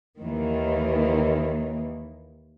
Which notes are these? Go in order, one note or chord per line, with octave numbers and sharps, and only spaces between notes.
D#2 D#3 E3 A#3